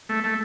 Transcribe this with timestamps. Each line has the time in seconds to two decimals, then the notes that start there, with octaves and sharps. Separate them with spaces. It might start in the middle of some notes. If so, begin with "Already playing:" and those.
0.09 A3
0.24 A3